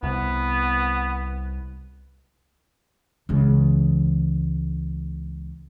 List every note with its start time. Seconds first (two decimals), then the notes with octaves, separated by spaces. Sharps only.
0.03 C2 B3
3.29 C#2 E3